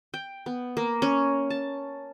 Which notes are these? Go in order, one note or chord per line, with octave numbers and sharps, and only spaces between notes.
G5
B3
A#3
C#4
A5